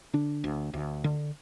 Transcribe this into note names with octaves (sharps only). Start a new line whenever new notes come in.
D3 D4
D2
D2
D3